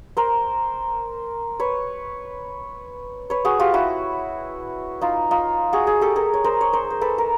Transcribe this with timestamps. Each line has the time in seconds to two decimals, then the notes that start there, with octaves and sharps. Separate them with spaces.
0.17 A#4 C5
1.60 B4 C#5
3.30 B4 C#5
3.45 F#4 G#4
3.60 F4 G4
3.74 E4 F#4
5.01 D#4 F4
5.31 D#4 F4
5.73 F#4 G#4
5.87 F#4 G#4
6.01 G4 A4
6.16 G#4 A#4
6.34 C#5
6.44 A#4 C5
6.61 C#5
6.73 A#4 C5
6.90 C5
7.01 A4 B4
7.18 A#4